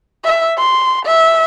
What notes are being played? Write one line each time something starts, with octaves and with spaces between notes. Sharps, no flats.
E5
C6
E5